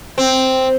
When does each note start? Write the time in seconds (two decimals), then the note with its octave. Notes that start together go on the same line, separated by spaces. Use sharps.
0.18 C4